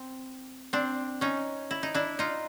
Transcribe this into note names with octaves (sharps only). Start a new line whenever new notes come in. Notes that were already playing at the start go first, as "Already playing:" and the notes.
Already playing: C4
C4 D4
C#4 D#4
E4
D#4
D4 E4
D#4 F4